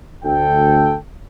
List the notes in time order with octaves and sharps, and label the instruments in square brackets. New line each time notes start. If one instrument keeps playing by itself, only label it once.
[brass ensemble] D2 A4 G5